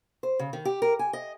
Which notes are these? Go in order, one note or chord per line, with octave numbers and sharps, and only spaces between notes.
C5
C#3
D#3
G4
A#4
G#5
D#5